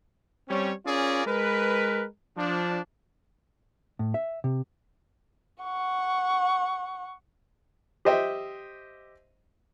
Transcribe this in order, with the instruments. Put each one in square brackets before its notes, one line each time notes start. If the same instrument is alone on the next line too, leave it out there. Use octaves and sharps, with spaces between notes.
[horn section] G3 C4 C#4 C#5
C#4 F4 G#4 A#4 D5
G#3 A#4 B4
F3 D4
[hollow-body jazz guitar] A2
E5
C3
[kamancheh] F#5 C#6
[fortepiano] G4 C5 D#5 E5 G5